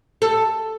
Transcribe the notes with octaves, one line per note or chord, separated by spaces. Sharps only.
A4